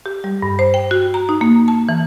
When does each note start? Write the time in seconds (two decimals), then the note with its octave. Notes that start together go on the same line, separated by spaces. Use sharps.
0.06 G4
0.24 G3
0.42 G2
0.59 C5
0.74 G5
0.91 F#4
1.14 A#5
1.29 D#4
1.41 A#3
1.68 A5
1.89 E3